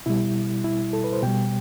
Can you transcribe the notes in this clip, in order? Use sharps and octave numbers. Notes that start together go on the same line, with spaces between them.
B2 G3 E4
E4
A4
B4
C5
B2 G3 G5